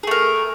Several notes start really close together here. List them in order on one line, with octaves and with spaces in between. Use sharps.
G#4 A3 A#4